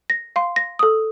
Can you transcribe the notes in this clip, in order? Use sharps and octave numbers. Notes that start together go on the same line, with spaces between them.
A#6
F5 C6
A#6
A4 D#6